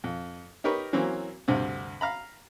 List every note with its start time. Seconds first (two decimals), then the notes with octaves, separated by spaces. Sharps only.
0.04 F2
0.64 D#4 G4 A#4 B4 C#5
0.93 E3 F#3 A#3 C4 C#4
1.48 D2 G2 C3 C4
2.01 F5 A#5 B5